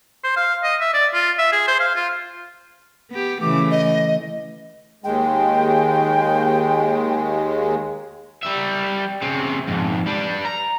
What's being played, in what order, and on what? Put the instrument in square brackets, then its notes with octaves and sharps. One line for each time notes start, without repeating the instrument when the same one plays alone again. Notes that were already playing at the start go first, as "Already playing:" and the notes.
[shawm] C5
F5
D#5
E5
D5
F4
E5
G#4
C5
F5
F4
[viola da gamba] B3 G4
[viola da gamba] C#3 E3 A3 [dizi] D6
[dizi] D#5
[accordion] D#2 G#3 [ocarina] G5
[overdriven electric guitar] G3 E5
C#3 C4
F2 G#2
G3 D4
A#5